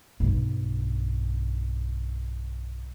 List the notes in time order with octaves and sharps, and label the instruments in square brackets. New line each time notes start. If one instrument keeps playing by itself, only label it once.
[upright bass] B1 G2